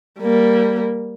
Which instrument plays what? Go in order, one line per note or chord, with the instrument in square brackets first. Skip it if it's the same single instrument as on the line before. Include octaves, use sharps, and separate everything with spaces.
[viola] G3 A#3